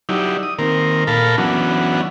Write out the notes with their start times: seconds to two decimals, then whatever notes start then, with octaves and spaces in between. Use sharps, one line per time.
0.09 F#3 D#4 E4 G4 D5
0.43 D#6
0.59 D#3 A#3 C4 A#4
1.07 A#2 A4 A#4 F5 A5 B5
1.38 E3 F#3 B3 C#4 D4 F#4